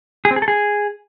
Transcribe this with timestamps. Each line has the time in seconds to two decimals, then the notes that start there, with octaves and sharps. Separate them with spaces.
0.25 G#4
0.31 C4
0.36 G#4
0.42 A4
0.48 G#4